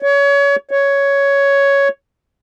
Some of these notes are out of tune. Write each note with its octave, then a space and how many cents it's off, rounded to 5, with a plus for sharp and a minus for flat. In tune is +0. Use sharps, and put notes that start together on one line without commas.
C#5 +30
C#5 +10